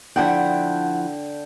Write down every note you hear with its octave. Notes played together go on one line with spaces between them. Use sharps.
D3 F3 E4 F#5 G5